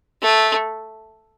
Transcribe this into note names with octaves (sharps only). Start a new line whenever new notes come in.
A3